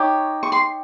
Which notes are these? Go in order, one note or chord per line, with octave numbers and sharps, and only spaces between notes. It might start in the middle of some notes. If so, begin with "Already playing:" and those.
Already playing: D#4 G4 C#5
C#6
C6